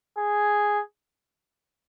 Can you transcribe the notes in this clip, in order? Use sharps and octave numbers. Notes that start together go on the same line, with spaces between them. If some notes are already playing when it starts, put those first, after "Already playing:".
G#4